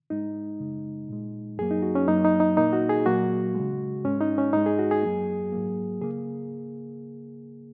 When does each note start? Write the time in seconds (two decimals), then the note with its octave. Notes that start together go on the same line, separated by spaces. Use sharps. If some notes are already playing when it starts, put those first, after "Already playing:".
0.10 G#2 G#3 D#4
0.60 F#2 C#3 G#3
1.09 A#2 G#3
1.58 F#2 F#3 A#3 G#4
1.71 D#4
1.82 F#4
1.95 C#4
2.07 F#2 F#3 A#3 D#4
2.25 D#4
2.40 D#4
2.57 A#2 A#3 D#4
2.73 F#4
2.90 G#4
3.06 A#2 F#3 A#3 F#4
3.55 C#3 G#3
4.04 G#2 G#3 C#4
4.21 D#4
4.38 C#4
4.53 G#2 G#3 D#4
4.66 G#4
4.79 F#4
4.91 G#4
5.02 F#2 F#3 A#3
5.52 G#2 F#3 A#3
6.01 C#3 A#3 G#4